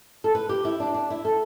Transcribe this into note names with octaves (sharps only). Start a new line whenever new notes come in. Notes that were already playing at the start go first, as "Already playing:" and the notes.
A4
B4
G4
E4
D4
D4
E4
A4